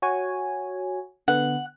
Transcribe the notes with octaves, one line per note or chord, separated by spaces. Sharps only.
F#4 C#5 G#5
D3 B3 F#5